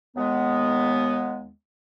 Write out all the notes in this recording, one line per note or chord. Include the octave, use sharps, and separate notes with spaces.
D#2 G#3 B3